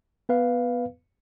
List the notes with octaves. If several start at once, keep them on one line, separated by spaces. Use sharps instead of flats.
B3 B4 F5